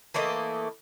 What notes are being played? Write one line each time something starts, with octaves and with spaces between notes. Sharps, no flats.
E3 A3 A#3 D#5